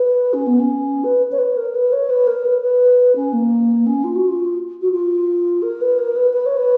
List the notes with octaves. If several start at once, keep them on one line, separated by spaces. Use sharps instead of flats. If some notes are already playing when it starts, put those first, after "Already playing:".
Already playing: B4
C#4
B3
C#4
B4
C#5
B4
A#4
B4
C#5
B4
A#4
B4
B4
C#4
A#3
C#4
F4
F#4
F4
F#4
F4
A#4
B4
A#4
B4
B4
C#5
B4